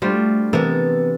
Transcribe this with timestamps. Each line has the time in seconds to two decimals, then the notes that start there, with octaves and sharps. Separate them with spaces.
0.02 G3 A3 D4 F4 F#4 C5
0.53 C3 E3 B3 A4 A#4